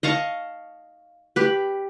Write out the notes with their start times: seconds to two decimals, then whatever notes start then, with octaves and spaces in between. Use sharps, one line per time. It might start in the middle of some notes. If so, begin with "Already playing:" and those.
0.03 D#5 F5 A5 C#6
1.36 G4 B4